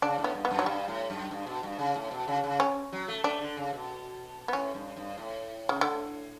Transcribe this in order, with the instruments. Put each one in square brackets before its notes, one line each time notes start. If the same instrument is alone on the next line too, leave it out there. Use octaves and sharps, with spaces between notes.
[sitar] C#3 [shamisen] D4
[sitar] A2
[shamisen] B3
[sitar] G2
[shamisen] B3
[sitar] F#2
[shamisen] F#3
[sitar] G2 [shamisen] G3
[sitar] A2
F#2
G2
B2
G2
C#3
A2
B2
C#3
C#3
[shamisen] C#4
[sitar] F#3
A3
[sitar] A3 [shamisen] D4
[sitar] D3
C#3
B2
[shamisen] B3
[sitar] A2 [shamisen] C#4
[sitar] G2
G2
A2
[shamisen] C#3
D3